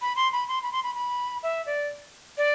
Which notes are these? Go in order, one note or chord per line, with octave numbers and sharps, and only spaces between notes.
B5
C6
B5
C6
B5
C6
B5
B5
E5
D5
D5